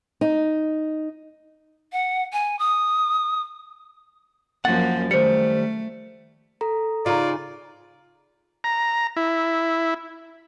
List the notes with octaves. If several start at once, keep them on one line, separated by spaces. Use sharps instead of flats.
D#4
F#5
G#5
D#6
F#2 F3 A#3 F#5 A6
D#3 G3 A3 C5 C#7
A4 A#5
C#3 D#4 F4 D5
A#5
E4